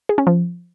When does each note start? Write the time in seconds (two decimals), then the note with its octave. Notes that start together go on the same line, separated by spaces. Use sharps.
0.09 G#4
0.18 C#4
0.27 F3